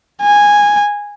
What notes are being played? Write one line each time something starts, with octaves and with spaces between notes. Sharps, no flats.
G#5